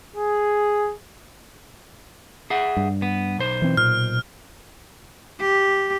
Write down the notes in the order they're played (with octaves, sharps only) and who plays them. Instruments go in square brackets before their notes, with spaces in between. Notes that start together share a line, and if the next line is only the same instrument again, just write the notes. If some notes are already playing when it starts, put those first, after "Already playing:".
[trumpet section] G#4
[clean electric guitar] G#4 E5 F#5
[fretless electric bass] G2
[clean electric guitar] B3
B1 C5
[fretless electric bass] E3 C4
[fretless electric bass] A#2 [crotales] F6
[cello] G4